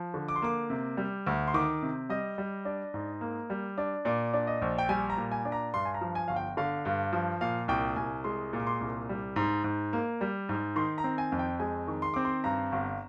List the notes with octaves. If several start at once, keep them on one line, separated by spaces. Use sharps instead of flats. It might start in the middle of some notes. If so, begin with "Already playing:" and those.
Already playing: F3
D3
D6
C6
A#3 D6
C3
G3
D2
C6
D#3 D6
C3
G3 D#5
G3
D4
G#2
A#3
G3
D4
A#2 D5
D4
D#5
A#1
G5
G3 G#5
A#5
A#2
G#5
D4
A#5
G2 C6
G#5
A#5
F3
G#5
G1 F5
G5
D3 F5
G2
F3
A#2 F5
C2 G5
C2 G#5
G#3 C6
A#2
D6
C6
C2
G3
G#2
G#2
A#3
G3
G#2
D#3 C6
A#5
C4
G#5
F2
G5
G#3 G#5
D#3
C6
C4 D6
C6
G2 A#5
G1